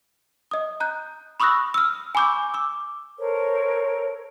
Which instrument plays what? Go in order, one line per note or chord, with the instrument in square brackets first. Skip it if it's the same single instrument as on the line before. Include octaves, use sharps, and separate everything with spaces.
[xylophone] D#5 D#6
A#5 F#6 G6
B5 C#6 D#6 E6 F#6 A#6
E6 F6
G#5 B5 C#6 D6 E6 G6
D6 E6
[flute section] A4 A#4 C5 C#5